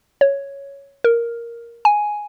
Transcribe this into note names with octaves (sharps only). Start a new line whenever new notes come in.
C#5
A#4
G#5